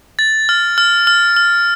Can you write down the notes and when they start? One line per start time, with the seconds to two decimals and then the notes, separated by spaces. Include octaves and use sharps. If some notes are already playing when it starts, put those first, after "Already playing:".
0.19 A6
0.49 F6
0.78 F6
1.07 F6
1.36 F6